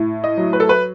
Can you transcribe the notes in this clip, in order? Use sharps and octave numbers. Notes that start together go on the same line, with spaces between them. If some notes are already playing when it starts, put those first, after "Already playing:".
Already playing: A2
D#5
F#3
B4
A4
B4